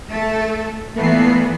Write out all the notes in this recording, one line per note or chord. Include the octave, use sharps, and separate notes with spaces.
A3 A4
A#2 E3 A3 B3 C7